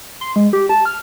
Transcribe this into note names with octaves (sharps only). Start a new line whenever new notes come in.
C6
G#3
G4
A5
F6